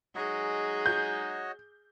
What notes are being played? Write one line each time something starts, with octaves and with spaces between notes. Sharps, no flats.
F#3 G#3 D#4 F#4 G#4 C#5 D#5
G6